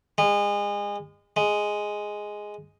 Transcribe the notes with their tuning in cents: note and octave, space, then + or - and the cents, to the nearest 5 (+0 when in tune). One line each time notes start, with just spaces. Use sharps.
G#3 -30
G#3 +0